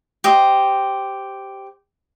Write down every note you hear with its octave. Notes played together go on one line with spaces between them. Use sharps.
G4 C5 D#5